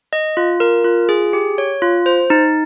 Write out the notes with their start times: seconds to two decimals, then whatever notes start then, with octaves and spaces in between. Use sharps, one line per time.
0.13 D#5
0.37 F4
0.60 A#4
0.84 F4
1.09 G#4
1.33 G4
1.58 C#5
1.82 F4
2.06 C5
2.30 D#4